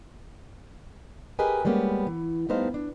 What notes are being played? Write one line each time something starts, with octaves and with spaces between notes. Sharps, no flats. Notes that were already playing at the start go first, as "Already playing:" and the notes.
G4 G#4 A#4 B4 D#5 G#5
G3 G#3 A#3 B3 C#4
E3
G3 A3 B3 D#4 C5 F5
D4